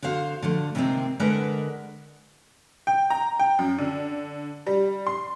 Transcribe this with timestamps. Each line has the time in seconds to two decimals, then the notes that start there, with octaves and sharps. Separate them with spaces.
0.02 D3 F#4 C5 F5
0.43 D3 F3 A3
0.75 C3 D#3 G#3 A#3 C4
1.19 D3 G#3 A#4 B4 F#5
2.87 G5
3.10 A#5
3.39 G5
3.59 F#2
3.79 D3
4.67 G3
5.07 C6